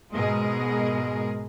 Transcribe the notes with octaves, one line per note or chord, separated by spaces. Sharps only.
G#2 B2 G#3 G#4 A#4 D#5